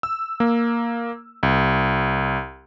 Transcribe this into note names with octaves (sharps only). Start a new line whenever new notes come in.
E6
A#3
C2